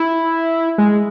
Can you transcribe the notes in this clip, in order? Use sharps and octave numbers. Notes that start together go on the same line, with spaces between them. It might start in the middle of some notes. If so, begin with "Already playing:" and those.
Already playing: E4
G#3